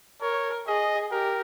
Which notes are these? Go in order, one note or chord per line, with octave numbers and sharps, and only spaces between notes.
A#4 C#5
G#4 D#5
G4 A#4